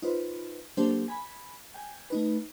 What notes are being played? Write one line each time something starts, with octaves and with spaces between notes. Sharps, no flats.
D#4 F4 B4 C5
F#3 A#3 D4 G4 A4 C5
G#5 B5
G5 G#5
A3 D#4 B4